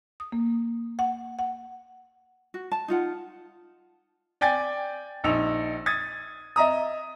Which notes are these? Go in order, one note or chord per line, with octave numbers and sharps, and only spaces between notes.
D#6
A#3
F#5
F#5
F#4
A5
D#4 F4 F#5
D5 G5 G#5 A6
A#1 D#4 E6 F7
D#6 G#6 A6
D#5 E5 A#5 D#6